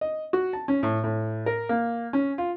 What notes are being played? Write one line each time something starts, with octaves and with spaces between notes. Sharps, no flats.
D#5
F#4
A5
C#4
A2
A2
A#4
A#3
C#4
F4